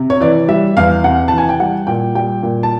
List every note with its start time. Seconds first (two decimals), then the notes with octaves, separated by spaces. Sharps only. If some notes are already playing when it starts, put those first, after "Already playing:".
Already playing: C3
0.10 C#5
0.20 E3 D5
0.48 G3 E5
0.77 E2 F5
1.04 C3 F#5
1.28 E3 A5
1.38 G#5
1.49 G5
1.59 G3 F#5
1.87 A#2 G5
2.15 G3 G5
2.43 A#2
2.63 A5